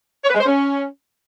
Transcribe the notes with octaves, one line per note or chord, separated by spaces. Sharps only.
C#5
B4
G#3
C5
C#4